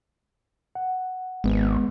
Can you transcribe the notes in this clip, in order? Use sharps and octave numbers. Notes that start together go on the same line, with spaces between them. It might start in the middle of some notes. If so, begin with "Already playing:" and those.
F#5
G#1 G#3 B3